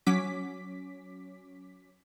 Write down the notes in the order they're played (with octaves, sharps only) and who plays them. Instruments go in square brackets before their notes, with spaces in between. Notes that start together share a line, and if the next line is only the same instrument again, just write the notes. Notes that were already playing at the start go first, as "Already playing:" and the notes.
[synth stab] F#3 C#4 D6 B6